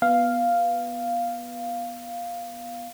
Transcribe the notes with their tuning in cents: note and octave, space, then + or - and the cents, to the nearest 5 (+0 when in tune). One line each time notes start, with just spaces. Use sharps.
B3 -10 F5 +0